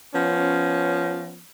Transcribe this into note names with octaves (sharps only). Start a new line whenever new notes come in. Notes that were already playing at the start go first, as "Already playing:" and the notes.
F3 B3 C#4